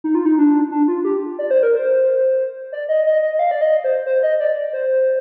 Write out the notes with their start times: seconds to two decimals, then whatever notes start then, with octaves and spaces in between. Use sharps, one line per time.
0.04 D#4
0.15 F4
0.25 D#4
0.38 D4
0.71 D4
0.88 F4
1.04 G4
1.39 D5
1.50 C5
1.63 A#4
1.76 C5
2.72 D5
2.89 D#5
3.06 D#5
3.22 D#5
3.33 D#5
3.39 F5
3.51 D5
3.61 D#5
3.84 C5
4.06 C5
4.23 D#5
4.40 D5
4.73 C5